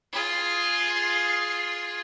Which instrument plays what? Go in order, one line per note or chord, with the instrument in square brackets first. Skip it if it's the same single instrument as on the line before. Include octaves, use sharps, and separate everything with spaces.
[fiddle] F4 G#4